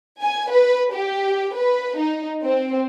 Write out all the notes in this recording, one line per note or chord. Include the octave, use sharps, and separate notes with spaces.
G#5
B4
G4
B4
D#4
C4